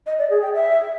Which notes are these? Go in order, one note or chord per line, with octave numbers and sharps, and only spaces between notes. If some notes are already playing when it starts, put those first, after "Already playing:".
D#5
D5
G#4
G5
E5